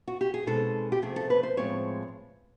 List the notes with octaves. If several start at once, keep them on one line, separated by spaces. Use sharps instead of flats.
F#4
G4
G#4
B2 G#3 C4 D#4 A4
G4
C3 F3 A3 C4 G#4
A4
B4
C5
A2 F3 G#3 C4 C#5